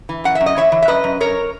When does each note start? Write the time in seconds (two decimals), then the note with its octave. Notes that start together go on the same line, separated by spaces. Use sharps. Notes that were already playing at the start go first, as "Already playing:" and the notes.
0.09 E3
0.24 F#2 F#5
0.35 E5
0.41 F#2
0.46 D#5
0.57 E3 C#5 E5
0.72 E3
0.82 E5
0.88 F#2 B4 D#5
1.04 F#2
1.20 F#2 A#4 C#5